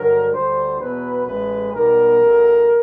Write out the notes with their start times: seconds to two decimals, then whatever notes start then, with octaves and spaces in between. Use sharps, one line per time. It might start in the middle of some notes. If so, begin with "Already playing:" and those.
Already playing: G2 D3 F#3 A#4
0.31 D2 D3 G3 C5
0.79 E2 B2 F#3 B4
1.26 A1 A2 E3 G#3 B4
1.73 B1 B2 G3 A#4
2.21 A1 A2 F#3